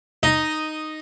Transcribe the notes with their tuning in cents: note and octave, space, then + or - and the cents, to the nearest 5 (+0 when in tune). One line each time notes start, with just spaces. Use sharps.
D#4 -5 D#5 +0